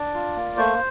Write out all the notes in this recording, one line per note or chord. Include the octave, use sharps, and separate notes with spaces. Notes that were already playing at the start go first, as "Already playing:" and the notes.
Already playing: D4 D5
F4
A#3
A3 C5